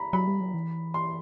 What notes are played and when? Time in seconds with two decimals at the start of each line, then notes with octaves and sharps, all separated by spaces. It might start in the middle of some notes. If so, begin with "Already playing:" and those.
Already playing: A#5 B5
0.13 F#3 B5
0.27 G3
0.40 F#3
0.54 E3
0.94 C6